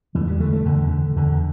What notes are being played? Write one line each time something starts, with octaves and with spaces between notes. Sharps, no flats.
E2 E3
G3
D3 A3
A3
E2 D3
D3
E2 D3